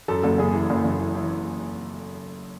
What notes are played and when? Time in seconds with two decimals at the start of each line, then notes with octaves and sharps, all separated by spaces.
0.08 F#2 A4
0.23 F#1 A4
0.38 F#1 G#4
0.53 E3
0.70 F#1
0.84 F#1
0.99 E3
1.15 E3